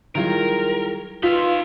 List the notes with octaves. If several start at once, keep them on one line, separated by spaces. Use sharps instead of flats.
D#3 F#3 G3 E4 F4 G#4 A#4
D#4 F4 B4 F5 E6 B6